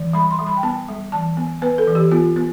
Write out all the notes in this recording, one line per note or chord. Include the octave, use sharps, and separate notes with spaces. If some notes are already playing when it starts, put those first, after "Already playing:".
Already playing: E3
G3 B5
C6
G3
B5
G5
B3 A5
G3
E3 A5
B3
B3 B4
A4
E3
G4
B3 F4
B3